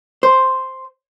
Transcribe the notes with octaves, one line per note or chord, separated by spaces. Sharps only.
C5